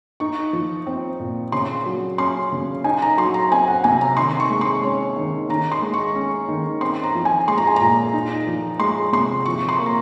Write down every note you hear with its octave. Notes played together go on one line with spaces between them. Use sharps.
D#4 C#6
F3
C4
A#2
C#3 C6
F#3
C#4 C6
C#3
D#4 G#5
A#5
F#3 C6
A#5
C4 G#5
F#5
C3 G#5
A#5
D#3 C6
C#6
G#3
C6
C#4 C#5
D#3
D#3 A#5
C6
G#3
C#6
C#4
D#3
C4 C6
A#5
F3
G#5
G#3 C6
A#5
G#5
A#2 A#5
D#4
F3
G#3 C6
C3 C6
F3 C#6
C6
A#3
A#5